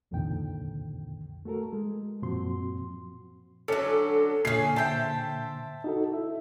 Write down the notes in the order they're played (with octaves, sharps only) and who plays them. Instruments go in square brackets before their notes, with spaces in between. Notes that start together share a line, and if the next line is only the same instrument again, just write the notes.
[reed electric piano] C2 F2 A#2 D3 D#3 G5
A3 F#4 A4 A#4
G#3
F#2 A#2 F3 C4 F#4 C6
[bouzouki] D3 F#3 [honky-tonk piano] C#4 A4
[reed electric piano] A#2 D3 [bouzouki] C#4 G#4 [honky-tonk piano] C7
[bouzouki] C5 G5 [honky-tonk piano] E5 A5
[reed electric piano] D#4 F#4 A4
E4 E5